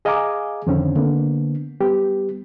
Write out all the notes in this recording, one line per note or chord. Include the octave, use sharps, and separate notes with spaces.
G#4 D#5 F5 G#5 A#5 D6
F2 D3 D#3 C4 C#4
D3 A#3 B3
G3 B3 G4